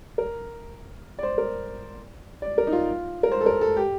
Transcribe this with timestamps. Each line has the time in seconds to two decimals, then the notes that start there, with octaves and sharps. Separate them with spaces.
0.18 A#4
1.19 D5
1.23 C5
1.38 A#4
2.42 D5
2.58 A#4
2.67 D#4
2.73 F4
3.23 A#4
3.31 C5
3.41 A4
3.46 A#4
3.61 A4
3.77 G4